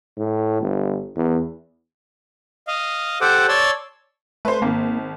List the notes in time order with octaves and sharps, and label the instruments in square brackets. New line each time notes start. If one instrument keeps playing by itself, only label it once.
[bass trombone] A2
G1
E2
[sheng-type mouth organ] D#5 F5
G4 A4 C5 F#5 D6
C#5 D5 A5 C6 E6
[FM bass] A3 [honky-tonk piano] B4 C5
[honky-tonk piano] G#1 [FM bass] A#3